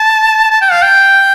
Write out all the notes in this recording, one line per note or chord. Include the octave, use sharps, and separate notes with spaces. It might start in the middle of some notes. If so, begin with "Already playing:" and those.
Already playing: A5
A5
G5
F5
G5